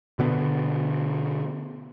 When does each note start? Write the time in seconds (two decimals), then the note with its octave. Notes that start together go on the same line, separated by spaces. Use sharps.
0.19 B2 D3 B3